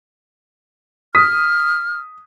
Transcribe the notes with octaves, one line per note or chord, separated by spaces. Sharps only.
D#6 F6 B6